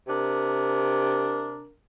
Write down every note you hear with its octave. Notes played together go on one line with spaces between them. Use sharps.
C3 D4 A#4